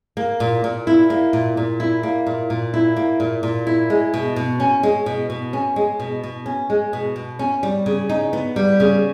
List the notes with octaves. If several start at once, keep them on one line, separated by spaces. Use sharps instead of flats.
A#3
A#2
A#2
E4
A#3
A#2
A#2
E4
A#3
A#2
A#2
E4
A#3
A#2
A#2
E4
G#3
B2
B2
C#4
G#3
B2
B2
C#4
G#3
B2
B2
C#4
G#3
B2
B2
C#4
G3
C#3
D#4
B3
G3
C#3